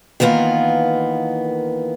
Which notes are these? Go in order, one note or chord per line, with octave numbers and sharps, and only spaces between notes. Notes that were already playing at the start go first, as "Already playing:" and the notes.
D#3 E3 A#3 B3 F4